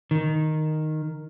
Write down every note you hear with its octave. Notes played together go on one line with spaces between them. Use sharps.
D#3